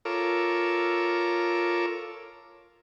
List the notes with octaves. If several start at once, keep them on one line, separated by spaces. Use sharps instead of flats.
F4 A4 A#4 C#5 D6 E6